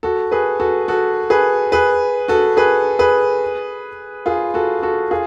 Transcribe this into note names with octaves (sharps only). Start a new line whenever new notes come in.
F#4 A4
G#4 B4
F#4 A4
F#4 A4
G#4 B4
G#4 B4
F#4 A4
G#4 B4
G#4 B4
F4 G#4
F#4 A4
F#4 A4
F4 G#4